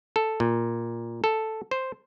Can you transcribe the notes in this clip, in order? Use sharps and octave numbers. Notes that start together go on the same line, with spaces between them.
A4
A#2
A4
C5